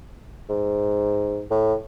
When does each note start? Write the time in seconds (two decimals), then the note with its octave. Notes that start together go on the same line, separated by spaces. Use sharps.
0.49 G#2
1.51 A2